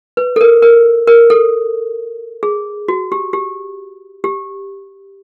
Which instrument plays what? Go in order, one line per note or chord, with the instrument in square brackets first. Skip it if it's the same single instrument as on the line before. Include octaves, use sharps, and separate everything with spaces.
[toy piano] B4
A4
A#4
A#4
A#4
A4
G#4
F#4
G4
G4
G4